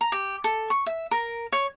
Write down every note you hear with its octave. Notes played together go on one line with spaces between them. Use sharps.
A#5
G4
A4
C#6
E5
A#4
C#5